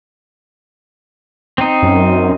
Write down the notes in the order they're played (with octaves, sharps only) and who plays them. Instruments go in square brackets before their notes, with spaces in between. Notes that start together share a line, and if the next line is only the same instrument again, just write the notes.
[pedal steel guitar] C4 D#4
[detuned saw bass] F#2